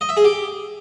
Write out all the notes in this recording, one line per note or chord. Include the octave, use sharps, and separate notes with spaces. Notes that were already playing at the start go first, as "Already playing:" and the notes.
D#5
E5
G#4
G4